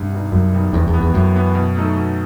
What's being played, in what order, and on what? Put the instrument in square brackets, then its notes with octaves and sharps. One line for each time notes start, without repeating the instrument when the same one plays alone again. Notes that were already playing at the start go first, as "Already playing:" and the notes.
Already playing: [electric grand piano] C2 [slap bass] G2
[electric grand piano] B2 G3 D#4
[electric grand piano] C2 [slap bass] F#2
[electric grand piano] B2 G3 D#4
[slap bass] E2 [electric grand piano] A2
[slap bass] E2
[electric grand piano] E3 B3
[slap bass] E2
[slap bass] F#2 [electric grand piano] A2
[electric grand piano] E3 B3
B2
F#3 A3 D#4 A4
B2